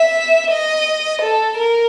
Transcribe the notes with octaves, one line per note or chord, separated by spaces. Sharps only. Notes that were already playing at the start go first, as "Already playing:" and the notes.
Already playing: E5
D#5
A4
A#4